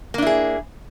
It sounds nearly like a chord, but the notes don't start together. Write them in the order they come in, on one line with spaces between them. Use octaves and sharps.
A#3 D4 E4 G#4